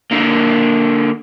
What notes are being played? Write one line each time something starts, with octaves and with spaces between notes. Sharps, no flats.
D3 A#3